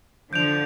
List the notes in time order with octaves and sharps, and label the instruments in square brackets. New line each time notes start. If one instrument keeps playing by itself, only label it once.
[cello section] D3 F3 [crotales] G6 D7 F7